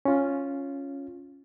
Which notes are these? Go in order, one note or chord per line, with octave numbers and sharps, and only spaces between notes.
C#4 F4